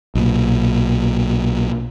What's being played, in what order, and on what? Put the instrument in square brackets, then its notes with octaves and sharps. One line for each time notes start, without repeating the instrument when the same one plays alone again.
[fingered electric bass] B1 A#2